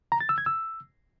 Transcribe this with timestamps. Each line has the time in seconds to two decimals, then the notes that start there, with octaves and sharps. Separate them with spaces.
0.12 A#5
0.20 A6
0.29 E6
0.38 G#6
0.46 E6